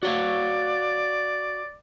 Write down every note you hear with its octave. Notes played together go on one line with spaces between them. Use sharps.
F#4 C#5 D5 F5